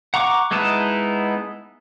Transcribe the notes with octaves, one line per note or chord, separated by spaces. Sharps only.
F#5 A#5 C#6 D6
G#3 B3 D#4 E4 A5